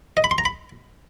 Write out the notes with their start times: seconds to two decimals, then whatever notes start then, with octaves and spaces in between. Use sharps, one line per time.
0.17 D#5
0.24 B5
0.31 C6
0.38 A#5
0.45 B5